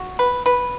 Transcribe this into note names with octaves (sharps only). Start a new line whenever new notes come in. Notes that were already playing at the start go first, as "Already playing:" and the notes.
Already playing: F#4
B4
B4